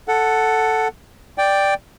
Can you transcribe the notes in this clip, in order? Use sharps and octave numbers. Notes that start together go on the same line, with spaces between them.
A4 F#5
D5 G5